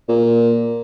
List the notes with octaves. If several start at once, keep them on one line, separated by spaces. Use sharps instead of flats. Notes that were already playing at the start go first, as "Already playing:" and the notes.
A#2